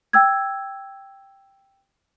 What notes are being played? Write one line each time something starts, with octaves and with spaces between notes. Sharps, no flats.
G5 E6 G#6